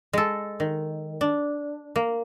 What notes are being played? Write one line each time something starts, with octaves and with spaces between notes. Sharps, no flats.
G#3 A4
D#3
D4
A#3